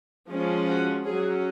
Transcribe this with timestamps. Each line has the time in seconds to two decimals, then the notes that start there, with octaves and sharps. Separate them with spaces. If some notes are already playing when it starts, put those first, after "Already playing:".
0.30 F3 G#3 C#4
0.68 F#4
1.05 F#3 C#4 G#4